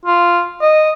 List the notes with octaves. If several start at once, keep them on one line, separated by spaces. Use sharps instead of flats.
F4
D#5